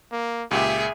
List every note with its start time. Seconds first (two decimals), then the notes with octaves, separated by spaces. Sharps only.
0.12 A#3
0.51 C#2 A#2 G4 G#4 E5